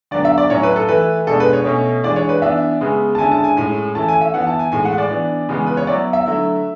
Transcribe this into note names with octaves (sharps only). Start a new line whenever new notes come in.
D3 F#3 B3 D5
E5
D5
A2 F#3 C#4 E4 C#5
B4
A4
E3 A3 E4 B4
B2 G#3 D4 A4
B4
C#5
B2 A3 C#4
E3 G#3 D4 D5
C#5
B4
E3 B3 D4 E5
C#3 G#3 B3
A5
D3 G#3 C#4 E4 G#5
A5
G#5
A2 G#3 C#4 G#5
E3 A3 C#4 E4 A5
G#5
E5
E3 B3 E4 F#5
A5
G#5
A2 E3 G#3 G#5
F#5
D5
E3 B3 D4
C#3 E3 G#3 B3
B4
C#5
F#3 B3 E4 D5
E5
D3 F#3 A3 E4